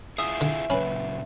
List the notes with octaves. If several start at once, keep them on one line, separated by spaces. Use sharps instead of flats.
E4 F4 G#4 E5 D#6
D3
A#2 C#3 F#3 C#4 B4 B5